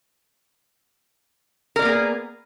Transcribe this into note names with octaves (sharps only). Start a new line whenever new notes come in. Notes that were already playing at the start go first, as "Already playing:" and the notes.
A#3 B3 G#4 A#4 D5